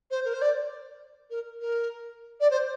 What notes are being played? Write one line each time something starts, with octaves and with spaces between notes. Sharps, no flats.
C5
A#4
C5
D5
A#4
A#4
D5
C5